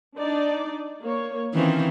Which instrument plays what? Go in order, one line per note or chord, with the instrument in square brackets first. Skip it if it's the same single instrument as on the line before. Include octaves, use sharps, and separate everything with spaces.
[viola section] D4 D#4 D5
A#3 C#5
[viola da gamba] D#3 E3 C4 [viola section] C#4 F4 C5